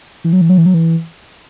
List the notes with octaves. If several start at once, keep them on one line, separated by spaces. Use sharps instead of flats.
E3
F#3
E3
F#3
E3
F#3
E3